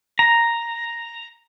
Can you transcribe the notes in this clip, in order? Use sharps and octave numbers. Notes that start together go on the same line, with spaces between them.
A#5